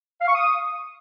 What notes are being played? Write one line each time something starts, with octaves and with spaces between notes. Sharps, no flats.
F5
C#6
D#6